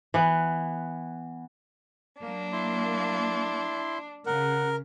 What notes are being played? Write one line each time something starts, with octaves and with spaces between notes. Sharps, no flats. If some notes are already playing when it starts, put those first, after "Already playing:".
E3 B3
F#3 A#3 D4
E4 C6
C#3 A#4 F#5